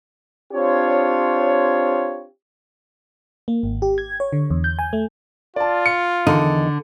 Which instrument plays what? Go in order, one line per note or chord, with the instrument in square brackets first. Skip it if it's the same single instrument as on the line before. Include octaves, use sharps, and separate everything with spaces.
[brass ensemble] C4 D4 F4 G4 C#5
[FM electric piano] A#3
G#1
G4
G#6
C#5
D3
E2
G6
G#5
A3
[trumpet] F4 [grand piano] D5 A5
[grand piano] C#7
[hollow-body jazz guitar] E2 D#3 D#4 [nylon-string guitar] D3